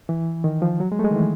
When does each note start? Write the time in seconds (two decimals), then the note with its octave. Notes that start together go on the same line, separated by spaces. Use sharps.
0.09 E3
0.44 D#3
0.62 F3
0.80 F#3
0.92 G#3
0.99 A3
1.04 G#3
1.11 D#3
1.16 E3